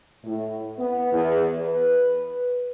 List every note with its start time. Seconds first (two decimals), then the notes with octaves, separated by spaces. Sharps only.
0.24 A2
0.78 B3
1.13 E2
1.61 B4